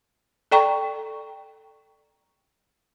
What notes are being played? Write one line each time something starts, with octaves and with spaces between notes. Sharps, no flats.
A4 D5 G5 A#5 C#6